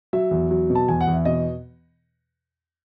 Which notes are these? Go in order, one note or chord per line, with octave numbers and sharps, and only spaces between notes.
F#3 E5
E2
F#3
B2
A5
E2 G#5
F#5
E2
E5
B2 D#5